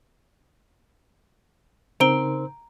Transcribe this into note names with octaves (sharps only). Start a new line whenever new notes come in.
C#3 C4 D#4 A#4 A#5 D7 G7